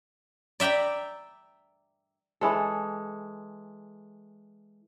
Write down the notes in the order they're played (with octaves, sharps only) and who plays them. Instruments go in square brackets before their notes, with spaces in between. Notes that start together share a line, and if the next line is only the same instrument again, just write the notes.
[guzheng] D5 E5 G5 A#5 B5
[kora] E3 G#3 A4